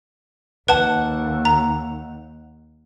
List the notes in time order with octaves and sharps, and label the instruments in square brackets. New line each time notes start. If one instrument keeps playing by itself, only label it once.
[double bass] D#2 [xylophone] B4 A5 [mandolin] F#5
[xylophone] A#5